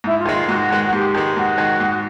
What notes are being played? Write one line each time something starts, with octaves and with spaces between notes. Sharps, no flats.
G#2 E4
F4
D#3 G#3
F4
G#2 F#4
D#3 G#3
F#4
G#2 G4
D#3 G#3
G#2 F#4
D#3 G#3
G#2